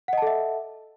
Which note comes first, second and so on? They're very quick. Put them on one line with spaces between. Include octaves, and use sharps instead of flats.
F#5 D#5 A5 A4 E5